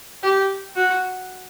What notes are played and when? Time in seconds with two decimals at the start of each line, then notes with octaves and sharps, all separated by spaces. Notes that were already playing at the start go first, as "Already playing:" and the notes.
0.23 G4
0.76 F#4